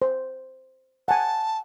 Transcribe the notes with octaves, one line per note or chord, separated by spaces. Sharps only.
C5
F#5 G#5 A5